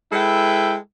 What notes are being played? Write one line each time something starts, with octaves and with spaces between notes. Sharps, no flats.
G#3 E4 A4 B4 G5